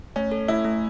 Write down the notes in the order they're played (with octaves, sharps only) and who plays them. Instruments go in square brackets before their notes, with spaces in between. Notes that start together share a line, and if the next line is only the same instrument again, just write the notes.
[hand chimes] A3 [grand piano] C#4
[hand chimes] A4
[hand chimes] A3 [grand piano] E4
[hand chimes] A3